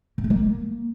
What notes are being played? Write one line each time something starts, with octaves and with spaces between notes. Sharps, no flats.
A#3
G#3
A#3